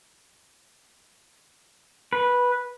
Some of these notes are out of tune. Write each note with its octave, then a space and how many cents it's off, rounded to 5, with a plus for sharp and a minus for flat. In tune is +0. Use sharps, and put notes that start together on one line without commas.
B4 -10